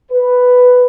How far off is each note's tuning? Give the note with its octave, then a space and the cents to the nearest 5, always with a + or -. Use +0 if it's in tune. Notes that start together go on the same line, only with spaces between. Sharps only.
B4 +5